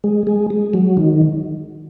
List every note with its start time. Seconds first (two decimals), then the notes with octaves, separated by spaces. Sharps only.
0.04 G#3
0.27 G#3
0.50 G#3
0.74 F#3
0.97 D#3